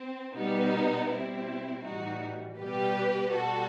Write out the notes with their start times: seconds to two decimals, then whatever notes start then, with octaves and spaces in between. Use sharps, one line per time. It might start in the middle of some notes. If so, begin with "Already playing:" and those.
Already playing: C4
0.35 B2 G3 B3 D#4
1.10 B2 G3 C4 E4
1.84 A2 E3 G3 D#4 F#4
2.58 B2 G3 G4 B4
3.33 B2 G3 F#4 A4